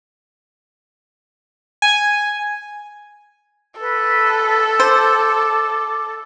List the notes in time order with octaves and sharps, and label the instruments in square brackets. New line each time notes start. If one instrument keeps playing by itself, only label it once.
[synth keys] G#5
[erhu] A4 [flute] B4
[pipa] C5 [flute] D6